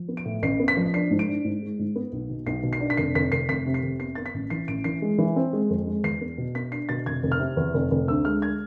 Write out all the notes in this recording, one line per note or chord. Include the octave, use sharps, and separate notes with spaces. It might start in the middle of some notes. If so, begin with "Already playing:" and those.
Already playing: F3
B3
D7
A2
A1 C7
B3
B6
F3
D4 C7
G#2
D7
D4
G#2
G#3
G#2
B3
B1
B2
B1 C7
B2
C7
D4
B6
F1 C7
F1 B6
F1 C7
F1 B6
C3
C7
F1
B3 C7
B3 A6
B6
A1
E3 C7
A1 D7
E3 C7
G#3
E3
C4
G#3
F2
G#3
E2 C7
B3
B2
B3 B6
D4 C7
B2 A6
F1 G#6
F1
F6
C3
E2
F1
F1
D2 E6
G#3 F6
G#6